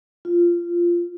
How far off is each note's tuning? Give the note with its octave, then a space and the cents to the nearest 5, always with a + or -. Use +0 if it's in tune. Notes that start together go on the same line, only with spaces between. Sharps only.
F4 -15